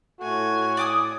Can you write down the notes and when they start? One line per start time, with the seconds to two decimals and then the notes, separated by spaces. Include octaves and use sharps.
0.20 A2 A3 F#4 G#5
0.77 D5 D6 D#6